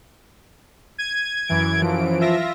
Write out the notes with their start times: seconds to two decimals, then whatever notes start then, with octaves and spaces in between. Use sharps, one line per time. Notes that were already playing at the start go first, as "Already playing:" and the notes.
0.98 G#6 D#7
1.48 F#2 E3 D7
1.82 F3
2.21 F4 E5 A#6